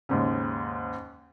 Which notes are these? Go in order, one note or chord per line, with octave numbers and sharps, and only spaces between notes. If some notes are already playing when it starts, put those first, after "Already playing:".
D#2 G#2 C#3